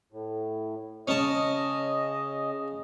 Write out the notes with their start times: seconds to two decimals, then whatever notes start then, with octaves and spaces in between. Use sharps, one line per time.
0.12 A2
1.08 C#3 C#4 D#5 A5